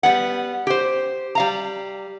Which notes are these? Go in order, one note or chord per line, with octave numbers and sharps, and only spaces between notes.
G3 B3 F#5
G4 C5
G3 F5 A#5